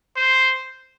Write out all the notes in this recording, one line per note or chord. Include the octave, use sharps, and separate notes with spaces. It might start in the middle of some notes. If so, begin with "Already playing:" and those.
C5